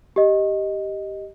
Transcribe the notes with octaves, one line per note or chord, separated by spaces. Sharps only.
G4 D#5